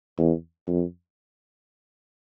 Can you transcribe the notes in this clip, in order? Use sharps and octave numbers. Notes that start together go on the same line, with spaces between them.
E2
F2